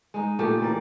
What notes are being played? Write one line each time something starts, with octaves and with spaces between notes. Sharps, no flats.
G#3 D#4
A#2 C#3 A3 G4
E3 A#4 D5